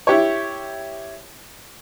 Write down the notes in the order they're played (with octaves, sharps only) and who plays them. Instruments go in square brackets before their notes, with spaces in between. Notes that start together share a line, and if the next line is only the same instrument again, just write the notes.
[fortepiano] E4 G4 C#5